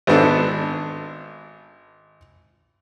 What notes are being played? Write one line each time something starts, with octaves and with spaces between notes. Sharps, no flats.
G#1 B3 D4 A4